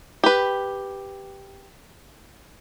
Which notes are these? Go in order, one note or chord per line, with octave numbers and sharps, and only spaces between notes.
G4 B4